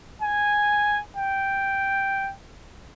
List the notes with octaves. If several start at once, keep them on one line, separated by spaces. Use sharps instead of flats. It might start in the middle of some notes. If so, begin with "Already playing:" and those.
G#5
G5